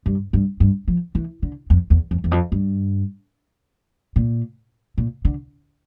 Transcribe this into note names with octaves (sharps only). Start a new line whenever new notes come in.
G2
G2
G2
F3
E3
D3
F2
E2
F2
E2
F2
G2
A#2
A#2
D3